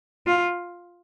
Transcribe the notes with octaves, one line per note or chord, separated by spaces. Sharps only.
F4